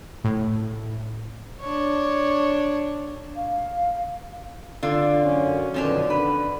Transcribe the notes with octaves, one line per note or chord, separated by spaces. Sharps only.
A2
D4 C#5
F5
D3 F4
F#2 C#4
B2 D3 D#3 F3 C#4 D4
D3 B4